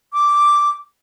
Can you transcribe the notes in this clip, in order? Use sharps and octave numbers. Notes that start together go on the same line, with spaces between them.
D6